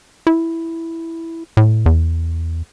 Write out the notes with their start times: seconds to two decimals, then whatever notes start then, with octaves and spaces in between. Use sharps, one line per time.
0.27 E4
1.57 A2
1.86 E2